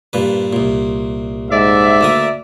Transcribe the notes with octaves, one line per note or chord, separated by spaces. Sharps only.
G2 A#2 B4
C2 A#2
G#2 D5 E5
D2 A#3 D#6